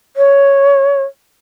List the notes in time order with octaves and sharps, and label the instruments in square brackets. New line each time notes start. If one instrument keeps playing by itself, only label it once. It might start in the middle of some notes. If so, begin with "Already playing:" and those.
[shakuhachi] C#5